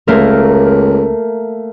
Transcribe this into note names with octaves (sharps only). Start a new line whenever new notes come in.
C#2 A3 A#3 A#4